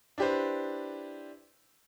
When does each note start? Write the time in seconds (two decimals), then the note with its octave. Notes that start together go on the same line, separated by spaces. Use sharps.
0.18 D4 E4 G4 B4 C5